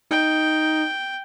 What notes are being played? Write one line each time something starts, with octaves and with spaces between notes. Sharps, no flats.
D#4 G5